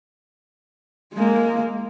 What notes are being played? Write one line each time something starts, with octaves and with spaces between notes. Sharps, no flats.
G#3 A#3